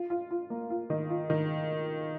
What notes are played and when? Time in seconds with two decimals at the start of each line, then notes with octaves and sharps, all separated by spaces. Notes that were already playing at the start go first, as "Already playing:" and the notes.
Already playing: F4
0.10 F4
0.31 F4
0.50 A#3
0.70 F4
0.90 D#3
1.10 F4
1.30 D#3